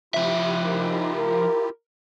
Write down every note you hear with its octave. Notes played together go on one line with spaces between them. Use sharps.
F3 E4 F4 G4 E5
D#4 A#4
A#4